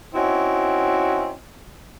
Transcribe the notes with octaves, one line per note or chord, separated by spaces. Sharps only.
C4 C#4 D#4 E4 F#4